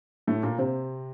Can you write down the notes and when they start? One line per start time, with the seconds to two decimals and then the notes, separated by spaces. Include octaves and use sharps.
0.27 A2 A3
0.43 A#2 A#3
0.58 C3 C4